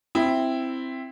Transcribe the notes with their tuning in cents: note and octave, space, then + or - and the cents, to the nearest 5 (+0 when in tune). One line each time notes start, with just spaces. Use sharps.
C4 +0 E4 +0